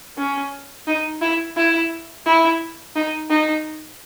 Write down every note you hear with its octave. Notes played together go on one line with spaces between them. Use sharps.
C#4
D#4
E4
E4
E4
D#4
D#4